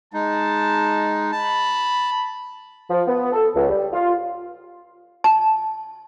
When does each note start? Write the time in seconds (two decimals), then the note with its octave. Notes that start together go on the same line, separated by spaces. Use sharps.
0.14 G#3 D#4 A5
1.32 A5 B5
2.90 F3
3.08 B3
3.32 A4
3.55 C#2
3.69 G3
3.93 F4
5.24 A5